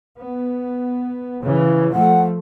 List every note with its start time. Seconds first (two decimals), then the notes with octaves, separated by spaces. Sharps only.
0.19 B3
1.44 C#3 E3
1.93 F3 A3 F#5